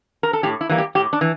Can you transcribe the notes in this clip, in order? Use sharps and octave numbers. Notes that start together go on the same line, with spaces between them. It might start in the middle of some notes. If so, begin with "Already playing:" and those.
A#4
A4
A2 G4
E4
E3 G3 A#3
G4
A2 G4
D4
E3